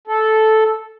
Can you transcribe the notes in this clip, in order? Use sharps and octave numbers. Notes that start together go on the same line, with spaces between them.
A4